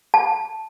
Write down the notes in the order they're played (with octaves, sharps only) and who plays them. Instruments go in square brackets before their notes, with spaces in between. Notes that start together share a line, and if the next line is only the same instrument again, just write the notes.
[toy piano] A5